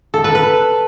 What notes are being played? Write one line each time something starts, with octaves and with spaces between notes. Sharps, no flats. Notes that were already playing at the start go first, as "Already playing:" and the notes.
A4
B4
B4